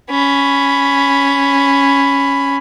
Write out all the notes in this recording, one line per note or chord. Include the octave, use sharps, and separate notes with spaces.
C#4 B5